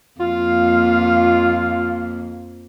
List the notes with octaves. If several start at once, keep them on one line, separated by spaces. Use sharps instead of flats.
F2 A#3 F4 F5